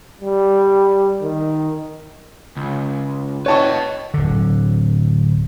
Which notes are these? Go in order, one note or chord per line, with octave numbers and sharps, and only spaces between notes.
G3
D#3
C#2
B4 C#5 D#5 A5 C#6
D1 D3